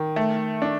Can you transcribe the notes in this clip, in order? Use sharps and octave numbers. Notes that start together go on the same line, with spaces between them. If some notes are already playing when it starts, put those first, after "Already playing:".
Already playing: D#3
A3
D4